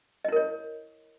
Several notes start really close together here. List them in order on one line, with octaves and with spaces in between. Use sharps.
D#5 E4 A#4 C#5